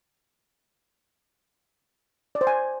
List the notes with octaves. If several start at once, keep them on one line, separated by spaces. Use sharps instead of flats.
D5
C5
G#5